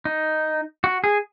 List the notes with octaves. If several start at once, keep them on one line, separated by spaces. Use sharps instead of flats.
D#4
F#4
G#4